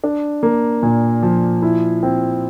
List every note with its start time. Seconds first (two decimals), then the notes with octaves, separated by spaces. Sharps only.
0.04 D4
0.43 A#3
0.83 A#2
1.23 F3
1.62 E4
2.03 C4